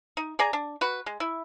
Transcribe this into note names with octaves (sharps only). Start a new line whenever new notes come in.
D#4
G#4 D5 G#5 A#5
D4
F#4 B4
G#3
E4